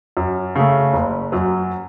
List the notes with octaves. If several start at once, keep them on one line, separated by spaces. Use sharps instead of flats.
F#2
C#3 A3
F#1
F#2 F#3